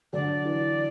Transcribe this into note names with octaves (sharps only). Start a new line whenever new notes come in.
D3 F#3 D5
E3